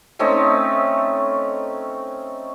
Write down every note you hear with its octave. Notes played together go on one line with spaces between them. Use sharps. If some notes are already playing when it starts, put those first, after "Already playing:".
A3 C4 C#4 D#4